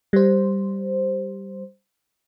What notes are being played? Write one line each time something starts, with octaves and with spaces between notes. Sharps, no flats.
G3 C5